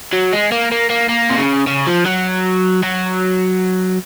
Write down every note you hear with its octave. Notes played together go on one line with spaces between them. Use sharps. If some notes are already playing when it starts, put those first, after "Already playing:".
F#3
G#3
A#3
A#3
A#3
A#3
C3
C#3
C#3
F3
F#3
F#3